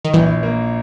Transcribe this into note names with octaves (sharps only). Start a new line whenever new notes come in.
D#3
A#1 E3
A#3